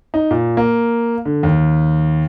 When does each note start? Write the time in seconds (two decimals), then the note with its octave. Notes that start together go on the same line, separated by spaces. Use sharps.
0.14 D#4
0.31 A#2
0.57 A#3
1.25 D3
1.43 D#2